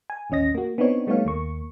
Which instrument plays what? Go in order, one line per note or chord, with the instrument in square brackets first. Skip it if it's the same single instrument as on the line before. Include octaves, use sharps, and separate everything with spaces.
[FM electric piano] G#5
A1 D#2 C#4 D#5 A#6
A#3 F#4
B3 C4 D4 D#4 C#5
G3 A3 B3 D#4 C#5 F5
D#2 A#3 C#6